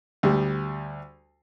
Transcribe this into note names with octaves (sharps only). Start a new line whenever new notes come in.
D2 G3